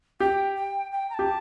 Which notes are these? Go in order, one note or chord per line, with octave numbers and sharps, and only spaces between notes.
G4 G5
G5
G5
A#5
G4 A5